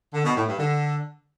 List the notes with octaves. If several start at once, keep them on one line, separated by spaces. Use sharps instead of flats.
D3
B2
A2
G2
D3